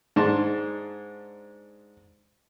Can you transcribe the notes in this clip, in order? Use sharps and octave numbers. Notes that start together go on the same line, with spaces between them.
G#2 G#3 D4 A5 C6